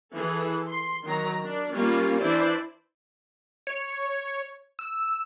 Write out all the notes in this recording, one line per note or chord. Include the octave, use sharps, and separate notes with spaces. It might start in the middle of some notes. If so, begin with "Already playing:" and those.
E3 G#4 A4
C6
D#3 F#3 A#5
D4 A#4
G3 A#3 C#4 F4
E3 D4 E4 C5 D5
C#5
E6